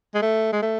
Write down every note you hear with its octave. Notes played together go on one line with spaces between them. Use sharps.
G#3
A3
G#3
A3